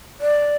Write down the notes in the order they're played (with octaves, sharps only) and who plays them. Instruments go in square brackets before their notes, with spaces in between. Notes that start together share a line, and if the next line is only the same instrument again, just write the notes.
[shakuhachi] D5